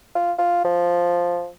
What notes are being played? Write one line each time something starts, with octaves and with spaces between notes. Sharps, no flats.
F4
F4
F3